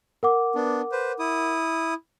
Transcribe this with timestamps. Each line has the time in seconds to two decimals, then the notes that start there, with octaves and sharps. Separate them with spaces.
0.23 A#4 F#5 D6
0.55 B3 D4
0.92 B4 C5
1.19 E4 D#6